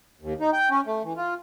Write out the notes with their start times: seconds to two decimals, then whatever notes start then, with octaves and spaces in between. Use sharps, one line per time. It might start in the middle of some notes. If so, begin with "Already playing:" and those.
0.21 D#2
0.40 D#4
0.53 G5
0.70 C#4
0.86 A3
1.04 E3
1.17 F4